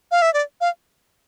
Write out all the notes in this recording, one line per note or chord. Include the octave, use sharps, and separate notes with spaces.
F5
E5
D5
F5